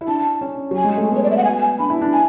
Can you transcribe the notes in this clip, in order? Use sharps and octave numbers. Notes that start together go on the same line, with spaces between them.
E4
D4 A5
C#4
F#3
G#5
G#3
A3
B3
C#5
D5
E5
F#5
G#5
G#5
D4 B5
E4
D4
G#5